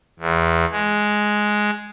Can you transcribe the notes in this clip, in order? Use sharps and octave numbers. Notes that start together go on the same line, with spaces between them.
E2
G#3